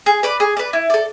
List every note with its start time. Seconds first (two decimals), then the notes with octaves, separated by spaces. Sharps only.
0.06 G#4
0.23 B4 D5
0.40 G#4
0.57 B4 D5
0.73 E4
0.90 A4 D5